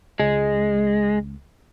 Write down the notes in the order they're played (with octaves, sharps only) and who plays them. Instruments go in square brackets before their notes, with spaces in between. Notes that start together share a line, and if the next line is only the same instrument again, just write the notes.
[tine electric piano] C#2 [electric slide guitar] G#3